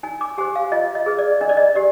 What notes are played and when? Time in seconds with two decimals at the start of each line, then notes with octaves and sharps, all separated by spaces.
0.03 D#4 G#5
0.21 D6
0.38 G4 C5 G#5
0.56 F5
0.72 F4 D#5
0.95 D#5
1.06 G#4 B4
1.18 D5
1.41 D4 D#5
1.49 D5
1.57 D#5
1.75 G4 D5